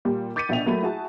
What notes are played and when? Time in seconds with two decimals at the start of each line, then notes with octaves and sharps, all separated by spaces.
0.05 A#2 G3
0.36 D6 G6 A6 B6 C#7 D#7
0.49 A#1 B2 D4 E5 G5 F7
0.66 F#3 A3 A#3 B5 D#7
0.82 E4 F#4 G#4 A5